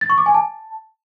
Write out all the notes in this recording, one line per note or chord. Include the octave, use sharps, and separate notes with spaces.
A6
C#6
D6
G#5
A5